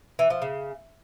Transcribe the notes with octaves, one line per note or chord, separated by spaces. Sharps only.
E3
F3
C#3